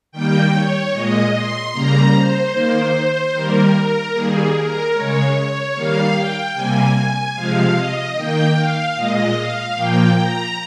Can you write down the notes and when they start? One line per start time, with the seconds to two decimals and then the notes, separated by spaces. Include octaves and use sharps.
0.12 D#3 G3 A#3 G5
0.53 C#5
0.93 A#2 G#3 D#5
1.33 C6
1.72 C#3 G3 A#3 A#5
2.13 C5
2.53 D#3 A#3
3.33 D#3 G3 A#3 A#4
4.13 D#3 G3 A#3 G#4
4.54 A#4
4.93 C#3 G#3 C#5
5.34 C#5
5.74 D#3 G3 A#3 F5
6.14 G5
6.54 C3 G3 A#3 G#5
7.35 C3 F3 G#3 F5
7.74 D#5
8.15 D#3 A#3 G5
8.55 F5
8.95 A#2 G#3 D#5
9.35 F5
9.75 A#2 F3 A#3 G5
10.16 A#5